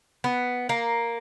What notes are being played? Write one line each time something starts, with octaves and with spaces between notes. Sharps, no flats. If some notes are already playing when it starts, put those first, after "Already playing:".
B3
A#3